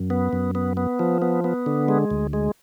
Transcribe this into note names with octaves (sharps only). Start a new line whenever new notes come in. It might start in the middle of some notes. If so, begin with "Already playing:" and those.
Already playing: F#2
B3
F#2
B3
B3
F3
B3
B3
D3
G#3
D2
G#3